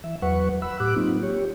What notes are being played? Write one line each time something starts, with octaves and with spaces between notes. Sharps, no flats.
E3 E5
E2 F#3 B4 F#5 C#6
F#5 B5 E6
A2 G4 D6 F#6
F#3 A#3 C4 D#4 F4
G4 C#5